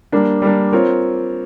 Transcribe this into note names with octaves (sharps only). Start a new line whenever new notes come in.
G3 A#3 D4
G3 A#3 D4
C4 F4 A#4 C#5